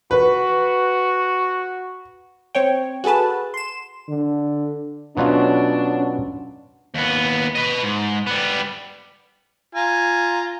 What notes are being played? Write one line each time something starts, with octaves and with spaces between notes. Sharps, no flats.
F#4 B4
C4 C#5 G5
F#4 G#4 A4 B4 A5
C6 E7
D3
B2 F#3 C#4 D4 F4
D#2 B3
B4 D#5
G#2
G3 B3
F4 G#5 A#5